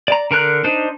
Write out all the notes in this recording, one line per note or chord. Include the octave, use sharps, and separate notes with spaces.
D5 A#5
D3 A#4 A#5 F#6
D4 D#4 C5